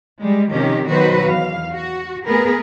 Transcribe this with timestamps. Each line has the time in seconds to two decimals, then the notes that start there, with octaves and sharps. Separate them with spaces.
0.21 G3 G#3
0.51 C3 D#3 F3 C#4 G4
0.89 B2 D#3 F#3 F#4 B4 C5
1.25 E2 F5
1.72 F#4
2.27 A3 B3 G#4 A#4 B4